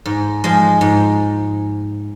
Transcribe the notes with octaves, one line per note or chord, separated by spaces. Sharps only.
G#2
F3 G#3
G#2